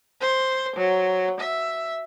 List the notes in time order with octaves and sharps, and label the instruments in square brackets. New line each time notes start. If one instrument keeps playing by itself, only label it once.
[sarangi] C5
F#3
E5